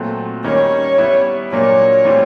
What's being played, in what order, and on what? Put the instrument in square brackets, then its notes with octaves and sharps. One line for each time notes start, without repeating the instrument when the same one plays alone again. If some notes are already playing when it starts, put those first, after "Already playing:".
Already playing: [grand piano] A#2 F#3 A3 C4
[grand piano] D#3 G3 A#3 C#4 [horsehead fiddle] C#5
[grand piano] G3 B3 E4
[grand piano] A#2 F#3 A#3 D4 [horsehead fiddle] C#5
[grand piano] A2 E3 G3 C4 F4